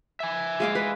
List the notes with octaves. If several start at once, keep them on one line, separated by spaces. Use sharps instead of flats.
E5 G#5
G#3 F5 D6
B4